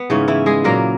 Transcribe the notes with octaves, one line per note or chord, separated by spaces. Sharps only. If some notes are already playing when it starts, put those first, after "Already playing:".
Already playing: B3
G#2 C#3 E3 C#4
E3 E4
G#3 G#4
A#2 F#3 A#3 A#4